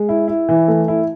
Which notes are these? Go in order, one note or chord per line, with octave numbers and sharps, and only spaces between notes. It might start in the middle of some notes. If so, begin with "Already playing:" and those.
Already playing: G#3
E4
E4
E3
A3
E4